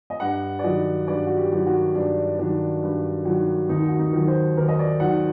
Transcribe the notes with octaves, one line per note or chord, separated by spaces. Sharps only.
D#5
G2 F#5
D5
D#3 F#3 D#5
G2 D5
F#4
G4
D#3 F#3
F#4
G2 D4
D#3 F#3 D4
G2
D#3 F#3
D#2 D#4
F#4
D#4
D#3 F#3
C5
D#2 A#4
D#5
D5
D#3 F#3 F#5